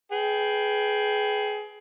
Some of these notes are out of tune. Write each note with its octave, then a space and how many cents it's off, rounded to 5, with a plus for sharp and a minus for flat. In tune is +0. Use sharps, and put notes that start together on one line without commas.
G#4 +20 B4 +0 G5 +0